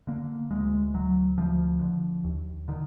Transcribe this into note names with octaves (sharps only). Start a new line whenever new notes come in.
D3 A#3
D2 G#3
D2 F#3
D2 F3
D3
D#2
D3 D#3